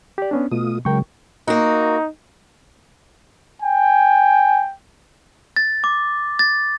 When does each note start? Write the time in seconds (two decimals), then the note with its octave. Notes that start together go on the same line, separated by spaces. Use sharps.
0.18 G4 D5
0.31 B3 C#4 D4
0.51 B2 A3 F4 D#6
0.85 C#3 F#3 G#3 A#4 G5 C#6
1.48 A#3 D#4 F#4
3.62 G5 G#5
5.56 A6
5.84 D6
6.39 A6